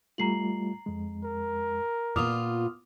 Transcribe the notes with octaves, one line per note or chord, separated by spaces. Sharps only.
G3 A3 F4 A#5 C7 F#7
F2 G#3
A#4
A#2 B3 F4 D6 D#6 F6 F7